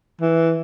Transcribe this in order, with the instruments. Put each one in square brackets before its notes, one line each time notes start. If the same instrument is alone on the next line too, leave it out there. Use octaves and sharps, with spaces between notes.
[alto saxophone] E3